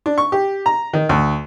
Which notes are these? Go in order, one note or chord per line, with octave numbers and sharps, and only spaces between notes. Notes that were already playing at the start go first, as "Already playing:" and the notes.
D4
C#6
G4
A#5
D#3
D2